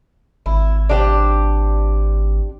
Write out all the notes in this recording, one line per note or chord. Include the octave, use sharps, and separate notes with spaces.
G#1 E4
D4 G4 C5